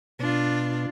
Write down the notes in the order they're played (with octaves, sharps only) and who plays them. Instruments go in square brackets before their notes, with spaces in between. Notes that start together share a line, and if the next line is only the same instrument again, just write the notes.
[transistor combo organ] B2 [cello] D4 F4